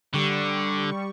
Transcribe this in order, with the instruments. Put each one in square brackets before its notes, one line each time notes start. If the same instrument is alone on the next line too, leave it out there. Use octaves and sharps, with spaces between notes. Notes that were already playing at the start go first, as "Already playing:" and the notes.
[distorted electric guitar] D3 [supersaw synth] G3 C#6